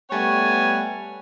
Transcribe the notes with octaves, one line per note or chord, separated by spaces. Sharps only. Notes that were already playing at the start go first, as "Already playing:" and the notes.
G3 A3 B3 C#5 F#5 G#5